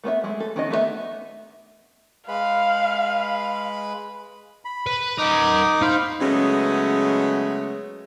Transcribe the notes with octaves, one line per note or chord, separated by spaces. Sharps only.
A3 B3 C5 E5
G#3 A3
A4
D#3 B3 C#4 D#5
A3 B3 B4 E5
G#3 B4 F5 B5
B5
B4
D#4 A#4 F#5 D6 D#6
D#4 C5 F5 B5
C#3 F#3 G#3 A3 B3 C#4